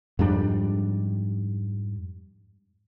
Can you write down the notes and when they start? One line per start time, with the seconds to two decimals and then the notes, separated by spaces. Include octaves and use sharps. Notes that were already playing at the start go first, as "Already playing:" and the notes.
0.19 F2 G#2 G3 D4